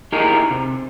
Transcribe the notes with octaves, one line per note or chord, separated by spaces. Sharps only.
D#4 E4 G4 G#4 A#4
C3